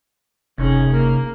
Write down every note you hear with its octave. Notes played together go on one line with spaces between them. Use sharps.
F#1 C3 C#4 D#4 G#4
A#3